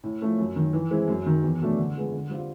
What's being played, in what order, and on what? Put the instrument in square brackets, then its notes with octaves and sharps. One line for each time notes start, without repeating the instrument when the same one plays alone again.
[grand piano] A2
F3 A3 C#4
F#2
D#3 F#3
E3
G#3 C4 E4
F#2
D#3 F#3
E2
B2 F#3 A3 D4
D3
F3 G#3 B3
D3
G3 C4 F4